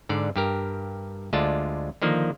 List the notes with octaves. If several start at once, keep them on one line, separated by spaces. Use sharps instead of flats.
G#2 D3 D5
G2 G4 A#4
D2 D3 G#3 F4 D5 A5
D3 D#3 F3 A#3